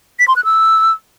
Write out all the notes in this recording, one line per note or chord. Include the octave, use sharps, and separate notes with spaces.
B6
C6
F#6
E6